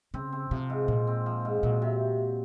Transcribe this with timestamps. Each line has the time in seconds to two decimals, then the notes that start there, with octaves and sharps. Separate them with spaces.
0.14 C#3 C4
0.32 C4
0.51 C3 F3
0.70 G#2
0.88 A#2 F3
1.07 C4
1.26 F3
1.45 G#2
1.63 A#2 F#3
1.82 C3